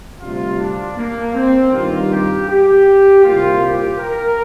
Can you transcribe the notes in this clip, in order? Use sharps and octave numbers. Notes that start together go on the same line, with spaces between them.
D2 C3 G3 F4
D4
A#3
C4
G2 D#3 G3 A#3 F4
G4
G4
C2 A#2 G3 A#3 F4
G4
A#4